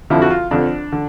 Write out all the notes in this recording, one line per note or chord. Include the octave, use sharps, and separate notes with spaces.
F2 D3 F3 E4
F#4
F4
F2 D3 F3 D4
D3